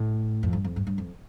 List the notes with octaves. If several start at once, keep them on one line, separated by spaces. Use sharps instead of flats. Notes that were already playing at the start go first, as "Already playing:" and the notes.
Already playing: A2
F2
G2
F2
G2
G2
F2